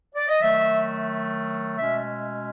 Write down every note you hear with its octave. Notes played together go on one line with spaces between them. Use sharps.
D5
D#5
D#3 F#3 A3 E5
B2 G#3 C#4 E5